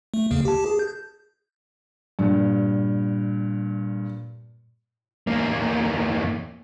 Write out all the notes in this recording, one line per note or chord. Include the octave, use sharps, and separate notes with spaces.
A3
E2 C#3 A#3
G4 A5
G#4
G6
G2 A#2
E2 A#3